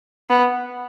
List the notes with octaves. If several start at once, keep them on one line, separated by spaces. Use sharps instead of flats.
B3